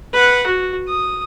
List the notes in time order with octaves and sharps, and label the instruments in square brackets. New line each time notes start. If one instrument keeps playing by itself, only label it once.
[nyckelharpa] B4 F#5
F#4
D#6